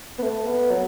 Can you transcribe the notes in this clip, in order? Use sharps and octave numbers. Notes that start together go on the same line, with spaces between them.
B3
A3
B3
F#3